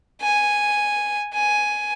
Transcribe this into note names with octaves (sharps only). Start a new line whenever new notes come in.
G#5
G#5